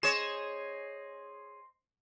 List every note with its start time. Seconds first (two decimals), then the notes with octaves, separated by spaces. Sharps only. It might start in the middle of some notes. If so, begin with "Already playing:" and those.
0.03 G#4 C5 C#5 D#5 E7